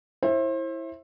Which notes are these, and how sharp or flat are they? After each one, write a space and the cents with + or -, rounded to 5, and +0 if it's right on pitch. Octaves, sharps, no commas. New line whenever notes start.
E4 +0 C5 +35 E5 +0